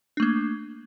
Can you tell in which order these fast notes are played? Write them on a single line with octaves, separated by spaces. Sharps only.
D4 A3 A#3